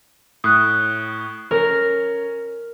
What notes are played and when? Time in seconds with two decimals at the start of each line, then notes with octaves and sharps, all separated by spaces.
0.44 A2 D#6 F#6
1.51 C#4 A#4